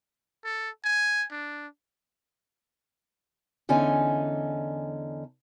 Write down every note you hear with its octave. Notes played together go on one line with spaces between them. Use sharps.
A4
G#5
D4
E2 D3 C#4 D#4 G#5